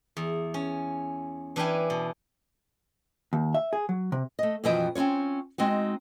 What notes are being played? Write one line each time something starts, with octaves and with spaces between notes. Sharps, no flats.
E2
C#4
E3 D4 B4 F5 G5 G#5
B2
D#2
E5
G#4
F#3
C3
A3 D#5
F#2 B2 E3 F3 D#5 G5
C4 C#4 D#4 F4 C#5
G#3 C4 D#4 F#4